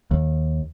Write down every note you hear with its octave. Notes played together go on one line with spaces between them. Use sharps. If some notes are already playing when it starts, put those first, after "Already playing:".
D#2